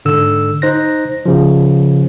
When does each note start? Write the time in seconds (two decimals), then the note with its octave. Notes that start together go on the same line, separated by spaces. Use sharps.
0.05 G#2 D3 E6
0.62 D#4 C5 F#6 A#6
1.26 C#3 F3